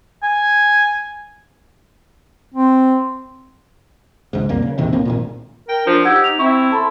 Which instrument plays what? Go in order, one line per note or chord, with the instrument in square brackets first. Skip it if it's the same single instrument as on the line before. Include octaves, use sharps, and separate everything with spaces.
[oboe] G#5
[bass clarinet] C4
[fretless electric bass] C#2 G#2
B1 F2 G3 A#3
C#3
A#1 E2 C3 D#3
B1 A2 A#3 C4
G#1 F2 A#2
[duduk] A#4 [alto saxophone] G5
[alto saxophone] F3 [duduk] D4
[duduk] D#4 [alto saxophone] G4 [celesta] F#5 E6 G#6
[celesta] F7
[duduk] C4 [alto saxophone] E4 [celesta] C#6
[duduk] A4 [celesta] A5 B5 C6